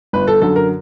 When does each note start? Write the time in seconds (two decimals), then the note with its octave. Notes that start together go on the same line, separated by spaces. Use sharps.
0.13 G1 B4
0.27 A4
0.41 F#2 D3 A4
0.56 A#4